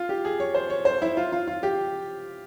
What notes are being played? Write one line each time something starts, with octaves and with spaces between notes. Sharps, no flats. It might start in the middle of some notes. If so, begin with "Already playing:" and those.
Already playing: F4
G4
G#4
C#5
C5
C#5
C5
E4
F4
F4
F4
G4